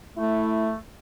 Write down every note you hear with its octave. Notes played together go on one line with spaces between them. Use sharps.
A3 E4